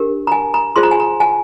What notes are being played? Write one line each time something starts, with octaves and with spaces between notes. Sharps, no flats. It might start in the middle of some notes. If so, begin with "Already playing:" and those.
Already playing: D4 G4 A#4
A#5
G#5
A#5
F4 G#4 C5 C6
A#5
G#5
A#5
G#5